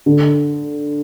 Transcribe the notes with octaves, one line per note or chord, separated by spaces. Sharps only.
D3